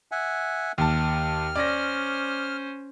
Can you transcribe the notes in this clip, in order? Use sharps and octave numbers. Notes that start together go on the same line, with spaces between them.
E5 F#5 G#5
D#2 A5 F6
C#4 C5 D5 A#6